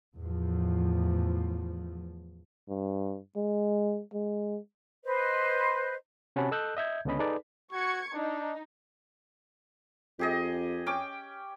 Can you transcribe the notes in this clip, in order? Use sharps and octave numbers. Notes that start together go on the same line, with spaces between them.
E2 A2 F3
G2
G#3
G#3
B4 C5 D#5
C3 C#4 F#4 F#5 A5 B5
A4 D#5 E6 F#6 G6
D#5 E5 G6 G#6
C#2 D3 B3 C#4 D#5 B5
D#4 G#4 A4 B4 D5
F#4 C#6 G#6 C#7
D4 D#4
F2 G4 G#4 D#5
C#4 G5 D6